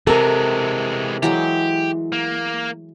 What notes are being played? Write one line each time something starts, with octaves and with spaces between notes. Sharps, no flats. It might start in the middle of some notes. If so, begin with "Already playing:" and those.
C3 E3 G#3 A4 A#4
E3 F#3 G#3 G4
A#3